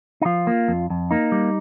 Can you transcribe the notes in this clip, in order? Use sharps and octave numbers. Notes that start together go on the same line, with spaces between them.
D#4
F3 F4
A#3
F2
F2
A#3 D#4
G3